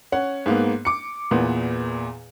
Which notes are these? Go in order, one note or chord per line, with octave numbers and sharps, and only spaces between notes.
C#4 F#5
G#2 A#3 B3
D6 C#7
E2 A#2 B3